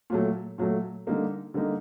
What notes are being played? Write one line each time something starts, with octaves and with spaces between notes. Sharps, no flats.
A#2 F#3 A3
A#2 F#3 A3
D3 G3 A#3 D#4
D3 G3 A#3 D#4